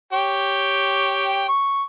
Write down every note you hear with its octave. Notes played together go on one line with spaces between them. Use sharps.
G4 C#5 G5
C#6